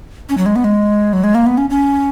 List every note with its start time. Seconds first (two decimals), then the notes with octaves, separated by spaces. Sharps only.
0.29 C#4
0.37 F#3
0.46 G#3
0.56 B3
0.64 G#3
1.13 F#3
1.24 G#3
1.35 A#3
1.46 B3
1.58 C#4
1.70 C#4